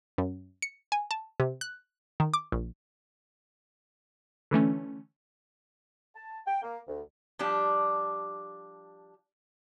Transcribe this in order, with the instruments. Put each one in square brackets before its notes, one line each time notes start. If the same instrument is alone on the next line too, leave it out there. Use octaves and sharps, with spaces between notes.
[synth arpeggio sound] F#2
C#7
G#5
A5
C3
F#6
D#3
D6
A#1
[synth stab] D3 E3 A3 C#4
[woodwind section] A5
G5
A#3
D2
[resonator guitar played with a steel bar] F3 G3 D4 G4